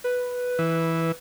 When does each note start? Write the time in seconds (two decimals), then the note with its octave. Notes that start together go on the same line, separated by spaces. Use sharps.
0.04 B4
0.59 E3